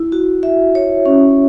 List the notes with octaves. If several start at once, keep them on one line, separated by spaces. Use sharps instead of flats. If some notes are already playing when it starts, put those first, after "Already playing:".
Already playing: E4
F#4
E5
C#5
C#4